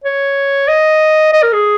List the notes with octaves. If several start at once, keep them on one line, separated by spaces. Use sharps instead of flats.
C#5
D#5
D#5
A#4
G#4